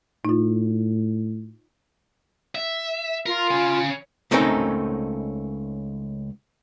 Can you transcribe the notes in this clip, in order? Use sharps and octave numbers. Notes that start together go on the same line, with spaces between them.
A2 D#4 F4
E5
F4 A#4
C#3 G#5
C#2 A3 C4 C#4 D#4 A#4